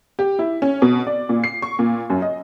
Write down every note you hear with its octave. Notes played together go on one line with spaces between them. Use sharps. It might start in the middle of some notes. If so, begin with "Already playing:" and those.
G4
E4
C#4
B2
D5
A#2
C7
C#6
A#2
F#2
D#5